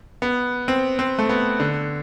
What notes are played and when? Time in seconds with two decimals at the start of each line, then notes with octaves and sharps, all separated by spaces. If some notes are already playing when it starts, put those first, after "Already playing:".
0.22 B3
0.68 C4
0.99 C4
1.18 A3
1.29 B3
1.60 D3